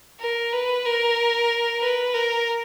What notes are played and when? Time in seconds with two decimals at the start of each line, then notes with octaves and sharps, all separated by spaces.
0.21 A#4
0.53 B4
0.85 A#4
1.81 B4
2.14 A#4